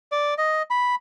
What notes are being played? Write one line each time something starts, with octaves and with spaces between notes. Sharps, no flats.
D5
D#5
B5